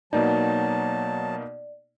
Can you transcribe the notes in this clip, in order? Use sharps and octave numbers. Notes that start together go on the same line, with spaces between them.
B2 F#3 A#3 D#4 D5 A5